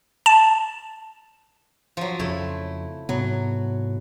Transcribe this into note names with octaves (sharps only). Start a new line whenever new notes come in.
A5
F3 F#3
F2 C#3 A3 E4
G#2 C3 F#3 B3